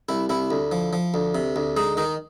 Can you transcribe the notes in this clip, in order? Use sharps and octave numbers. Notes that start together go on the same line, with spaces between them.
C2 E4
C2 E4
D2
F3
F3
D2
C3
D2
G#3 D#4
D#3 D#4